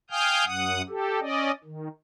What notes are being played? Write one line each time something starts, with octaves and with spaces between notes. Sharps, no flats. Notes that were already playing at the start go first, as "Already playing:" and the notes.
F5 G5 G#5 D#6 F6 G6
F#2 F#5 D#6
G4 A4
C#4 D5 D#5
D#3